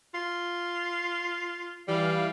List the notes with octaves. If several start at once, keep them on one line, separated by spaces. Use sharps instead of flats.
F4
E3 G3 F5